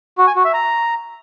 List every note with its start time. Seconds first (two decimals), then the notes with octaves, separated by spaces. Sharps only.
0.18 F#4
0.27 G#5
0.36 F#4
0.45 E5
0.54 A#5